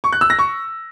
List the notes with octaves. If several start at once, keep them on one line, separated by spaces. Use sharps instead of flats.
C#6
F#6
E6
A#6
C#6